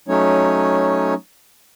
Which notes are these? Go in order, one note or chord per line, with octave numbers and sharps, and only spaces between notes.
F#3 A3 C#4 D#4 C#5